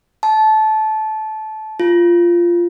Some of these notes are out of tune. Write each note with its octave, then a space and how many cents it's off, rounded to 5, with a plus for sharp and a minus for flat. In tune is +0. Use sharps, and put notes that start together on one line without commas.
A5 -20
F4 -10